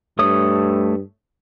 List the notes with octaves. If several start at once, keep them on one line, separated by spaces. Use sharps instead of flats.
G2 A3 C#5 D#6